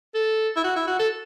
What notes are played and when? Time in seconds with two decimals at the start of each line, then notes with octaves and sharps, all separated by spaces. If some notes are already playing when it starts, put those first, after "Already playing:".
0.14 A4
0.56 E4
0.64 F#4
0.76 E4
0.87 F#4
0.99 A4